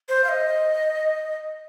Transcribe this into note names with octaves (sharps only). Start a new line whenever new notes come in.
C5
F5
D#5